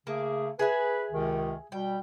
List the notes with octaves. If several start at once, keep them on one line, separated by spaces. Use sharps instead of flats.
C#3 A3 A#3 G#4
G#4 B4 E5 G#5
C#2 C3 D#3
B2 G3 G5